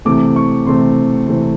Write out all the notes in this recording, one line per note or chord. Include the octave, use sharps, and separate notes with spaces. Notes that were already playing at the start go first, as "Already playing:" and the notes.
C3 E3 A3 C4 D6
C#6
C3 E3 A3 C4 C6
C3 E3 A3 C4